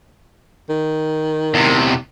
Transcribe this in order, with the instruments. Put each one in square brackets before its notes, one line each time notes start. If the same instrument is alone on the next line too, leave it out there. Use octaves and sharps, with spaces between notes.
[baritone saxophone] D#3
[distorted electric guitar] E2 C3